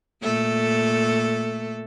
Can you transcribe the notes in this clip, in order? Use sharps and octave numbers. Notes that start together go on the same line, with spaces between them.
A#2 A3 A4